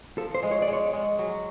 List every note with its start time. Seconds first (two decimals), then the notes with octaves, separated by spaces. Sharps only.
0.18 F3 A4
0.35 C5
0.43 G#3
0.51 C#5
0.62 D5
0.68 G#3
0.73 C#5
0.93 G#3
1.19 F#3